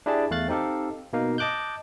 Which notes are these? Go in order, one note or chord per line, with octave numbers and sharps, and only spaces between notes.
D4 E4 G4 G#4 D5 A5
E2 A3 F5 F#6 A6
C4 D#4 G4 A4 F5
B2 A#3 D#4 F5
D#5 A5 D6 F#6 G6